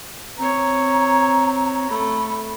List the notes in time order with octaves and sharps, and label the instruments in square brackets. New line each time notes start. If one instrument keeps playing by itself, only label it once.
[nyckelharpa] C4 C#5 [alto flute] A#5
[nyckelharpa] A3 [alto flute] B5